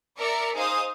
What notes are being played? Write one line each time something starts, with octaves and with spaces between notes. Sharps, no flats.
A#4 D5 E5 C#7
D#4 G#4 C5 F5 D#6